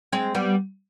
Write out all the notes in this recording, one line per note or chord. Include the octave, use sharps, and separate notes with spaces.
G#3 C4
G3 B3